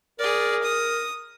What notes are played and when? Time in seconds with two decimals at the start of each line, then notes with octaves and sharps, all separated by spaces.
0.19 G#4 A#4 D5
0.63 D#6